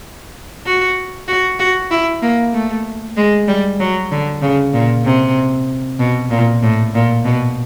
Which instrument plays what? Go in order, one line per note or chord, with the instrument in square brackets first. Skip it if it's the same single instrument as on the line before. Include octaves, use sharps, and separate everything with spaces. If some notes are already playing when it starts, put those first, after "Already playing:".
[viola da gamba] F#4
F#4
F#4
E4
A#3
A3
G#3
G3
F#3
D3
C#3
A#2
C3
B2
A#2
A2
A#2
B2